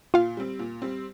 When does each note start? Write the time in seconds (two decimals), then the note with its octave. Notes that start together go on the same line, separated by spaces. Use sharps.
0.14 A#2 F4 F5
0.37 G3 C4
0.59 A#2
0.82 G3 C4